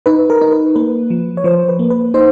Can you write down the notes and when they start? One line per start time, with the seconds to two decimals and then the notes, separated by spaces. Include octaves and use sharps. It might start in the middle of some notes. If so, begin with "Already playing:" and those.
0.06 D#4 B4
0.30 A#4
0.41 D#4
0.52 B4
0.76 A#3 B4
1.10 F3
1.37 C#5
1.44 F3 C5
1.68 B4
1.79 A#3
1.90 B4
2.14 D#4 C5